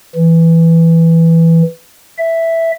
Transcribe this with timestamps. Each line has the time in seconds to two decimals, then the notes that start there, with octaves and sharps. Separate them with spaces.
0.16 E3
2.18 E5